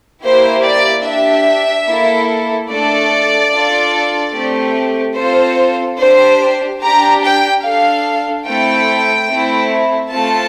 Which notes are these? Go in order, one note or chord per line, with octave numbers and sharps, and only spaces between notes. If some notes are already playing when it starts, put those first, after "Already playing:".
A#3 E4 G4 C5
D5
D4 G4 E5
A#3 E4 A4
A3 D4 A4 D5
D4 F4 A4
A3 C4 G4
C4 F4 A4 C5
D4 G4 C5
D4 G4 A#5
G5
D4 A4 F5
A3 C4 E4 A4 G5
A3 C4 E4
A3 C4 F4 A4 A5